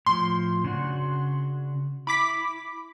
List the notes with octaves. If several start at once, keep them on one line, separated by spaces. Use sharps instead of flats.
A2 F3 C6
C#3 D4 F#4
E4 B5 D6 B6